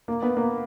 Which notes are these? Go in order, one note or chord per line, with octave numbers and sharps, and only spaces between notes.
A#3
B3
A#3